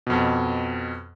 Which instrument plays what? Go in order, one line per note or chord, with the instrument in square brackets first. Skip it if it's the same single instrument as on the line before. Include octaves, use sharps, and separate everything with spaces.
[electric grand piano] F2 B2